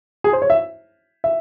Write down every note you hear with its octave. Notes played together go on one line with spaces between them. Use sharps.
G#4
C5
C#5
E5
E5